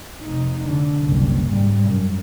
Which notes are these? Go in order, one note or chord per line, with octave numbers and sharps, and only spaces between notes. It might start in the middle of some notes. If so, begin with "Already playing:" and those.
F1 D#4
D3
F#1 C2
G#2 G3
F#2